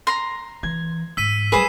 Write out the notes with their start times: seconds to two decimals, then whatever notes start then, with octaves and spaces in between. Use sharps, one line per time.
0.07 A#5 C6
0.63 E3 G#6
1.17 G#2 E6 B6 D#7
1.52 F#3 G3 G#4 B4 C5 B6 C7 E7